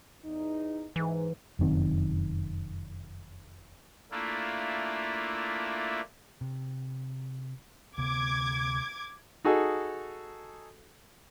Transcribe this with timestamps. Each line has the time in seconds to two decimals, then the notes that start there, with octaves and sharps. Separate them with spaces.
0.25 E2 D#4
0.96 G#2 E3
1.59 F1 F#2 D#3 C4
4.11 A3 A#3 D4 E4 F4
6.41 C3
7.98 D2 C3 B3 D6 G#6
9.45 D#4 F#4 G#4 A4